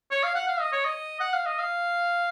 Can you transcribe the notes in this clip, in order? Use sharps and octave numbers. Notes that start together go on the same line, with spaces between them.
C#5
F5
F#5
F5
D#5
C#5
D#5
F#5
F5
D#5
F5